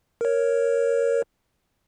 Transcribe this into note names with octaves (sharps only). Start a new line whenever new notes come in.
A#4 C#5